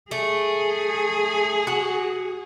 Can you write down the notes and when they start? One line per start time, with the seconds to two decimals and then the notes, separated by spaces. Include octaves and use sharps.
0.11 A3 G#4
1.67 F#4 F#5